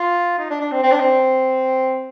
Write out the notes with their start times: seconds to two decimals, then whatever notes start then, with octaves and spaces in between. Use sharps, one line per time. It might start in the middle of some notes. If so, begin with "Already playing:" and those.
Already playing: F4
0.39 D#4
0.50 D4
0.61 D4
0.72 C4
0.83 C4
0.92 D4
1.00 C4